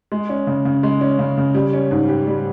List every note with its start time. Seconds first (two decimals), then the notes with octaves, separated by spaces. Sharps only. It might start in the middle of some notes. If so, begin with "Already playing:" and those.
0.12 G#3
0.29 C#4
0.47 C#3
0.65 C#3
0.83 G#3
1.01 C#4
1.19 C#3
1.37 C#3
1.55 G3
1.73 C#4
1.91 G#2
2.08 G4
2.27 G3